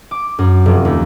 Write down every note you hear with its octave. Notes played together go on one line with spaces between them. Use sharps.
D6
F#2
F1
D#2